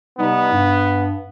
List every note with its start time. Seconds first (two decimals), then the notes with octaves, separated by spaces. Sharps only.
0.18 C3 G3 B3 D#4
0.52 G2